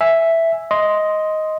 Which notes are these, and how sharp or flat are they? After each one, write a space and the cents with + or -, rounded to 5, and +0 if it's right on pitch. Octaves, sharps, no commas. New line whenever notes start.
E5 +0 G#5 +0
D#5 +10 C6 +0